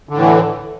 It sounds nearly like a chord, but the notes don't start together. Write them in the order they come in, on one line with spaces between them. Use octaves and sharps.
D3 A2 E3